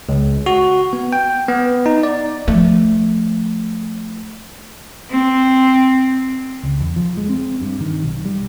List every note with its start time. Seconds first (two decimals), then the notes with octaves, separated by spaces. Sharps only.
0.09 C#2
0.46 F#4
0.93 B3
1.13 G5
1.48 B3
1.86 D#4
2.03 D5
2.48 F3 A3
5.11 C4
6.63 C#2
6.80 E2
6.96 F3
7.17 G#3
7.29 C4
7.61 G2
7.81 D#3
8.04 B1
8.25 G3